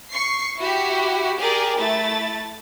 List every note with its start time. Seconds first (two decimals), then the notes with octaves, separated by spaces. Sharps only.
0.11 C#6 C7
0.59 E4 F#4 G4
1.38 G4 G#4 A#4 D5
1.78 A3 E4 A6